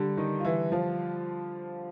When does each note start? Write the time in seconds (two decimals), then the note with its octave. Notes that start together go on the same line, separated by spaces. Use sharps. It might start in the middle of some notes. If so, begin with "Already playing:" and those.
Already playing: D3 G3
0.17 D#3 D#4
0.39 F4
0.45 E3 E4
0.72 F3 F4